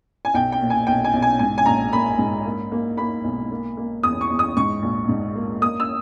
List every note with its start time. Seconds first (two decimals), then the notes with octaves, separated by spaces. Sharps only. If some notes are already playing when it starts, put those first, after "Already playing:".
0.25 G#5
0.34 B1 G5
0.52 G5
0.61 A#2
0.70 G#5
0.87 B1 G5
1.04 G#5
1.13 B1
1.22 G#5
1.39 G#2 G#5
1.58 G#5
1.66 A#1 A#5
1.93 A#3 B5
2.18 G#2
2.45 A#3
2.72 A#3
2.98 A#3 B5
3.24 B1
3.51 A#3
3.77 A#3
4.03 E2 D#6
4.21 C#6
4.30 E2
4.39 D#6
4.57 G#2 C#6
4.82 A#1
5.08 G#2
5.35 A#3
5.61 A#3 D#6
5.80 E6